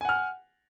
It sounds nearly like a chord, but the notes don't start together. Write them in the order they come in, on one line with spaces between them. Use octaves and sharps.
G#5 F#5 F6